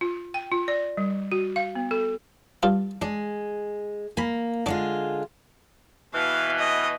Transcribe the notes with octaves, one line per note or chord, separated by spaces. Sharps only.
F4
G5
F4
D5
G3
F#4
F5
B3
A4
G2 D4 F4
G#3 D4
A#3 G#5 B5
D3 G#3 D4 F4 D6
B2 E3 F5
D#5